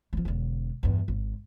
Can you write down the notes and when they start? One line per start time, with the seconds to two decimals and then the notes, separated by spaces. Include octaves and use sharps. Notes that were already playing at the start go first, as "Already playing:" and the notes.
0.13 F3 A3
0.25 E1 D3
0.83 E2 G2
1.08 G#1